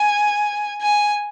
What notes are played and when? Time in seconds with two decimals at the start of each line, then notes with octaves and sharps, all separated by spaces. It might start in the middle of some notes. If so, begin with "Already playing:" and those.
Already playing: G#5
0.82 G#5